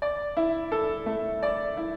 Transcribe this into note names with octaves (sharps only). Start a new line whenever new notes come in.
D5
E4
A4
A3
D5
E4